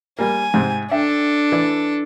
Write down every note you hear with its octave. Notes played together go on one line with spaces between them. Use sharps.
G3 A#3 G#5
G#2 C3 C4
D4 A4 E5 G5
E3 D5